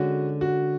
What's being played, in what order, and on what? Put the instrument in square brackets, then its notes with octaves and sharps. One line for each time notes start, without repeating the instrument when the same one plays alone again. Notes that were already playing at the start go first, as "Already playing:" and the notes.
Already playing: [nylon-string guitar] D3 G#3 C#4 [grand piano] F#4
[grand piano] F#4